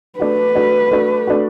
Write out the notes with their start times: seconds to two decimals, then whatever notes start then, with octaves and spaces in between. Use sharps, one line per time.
0.19 A3 D4 F#4 B4
0.55 A3 D4 F#4
0.91 A3 D4 F#4
1.27 A3 D4 F#4